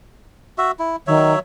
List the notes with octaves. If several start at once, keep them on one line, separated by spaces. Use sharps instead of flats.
F#4 E5
E4
D#3 F#3 C#5 E5